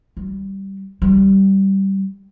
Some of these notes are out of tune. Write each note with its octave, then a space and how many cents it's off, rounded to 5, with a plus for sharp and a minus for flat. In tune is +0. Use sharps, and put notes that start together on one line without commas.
G3 -10
G3 -15